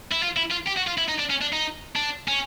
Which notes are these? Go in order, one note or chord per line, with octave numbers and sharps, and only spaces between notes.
E4
F4
E4
F4
G4
F#4
F4
E4
D#4
D4
C#4
D4
D#4
D4
C#4